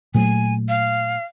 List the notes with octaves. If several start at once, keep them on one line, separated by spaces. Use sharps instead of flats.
A#2 F#3 A3 G#5
F5